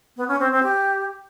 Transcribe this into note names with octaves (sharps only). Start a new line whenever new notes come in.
B3
C#4
C4
C4
G4